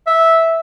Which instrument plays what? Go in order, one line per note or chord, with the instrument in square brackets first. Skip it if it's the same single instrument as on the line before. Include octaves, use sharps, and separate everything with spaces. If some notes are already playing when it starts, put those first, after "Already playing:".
[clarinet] E5